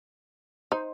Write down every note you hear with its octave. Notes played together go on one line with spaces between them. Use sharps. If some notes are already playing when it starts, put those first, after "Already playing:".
D#4 C5